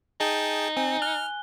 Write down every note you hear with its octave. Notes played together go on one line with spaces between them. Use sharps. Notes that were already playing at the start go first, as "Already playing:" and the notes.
D#4 G#4 G5 A5
C4 G#5
F6 F#6 G7